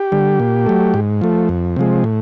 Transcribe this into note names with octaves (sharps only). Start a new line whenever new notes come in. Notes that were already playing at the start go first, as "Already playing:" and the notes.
Already playing: G4
D3 G3
A#2
F#3 A3
G#2
F3 A3
F2
C3 F3 G#3
A2